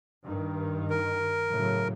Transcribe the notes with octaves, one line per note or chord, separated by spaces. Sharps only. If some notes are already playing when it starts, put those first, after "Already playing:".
G2 D#3
A#4
A2 C#3 F#3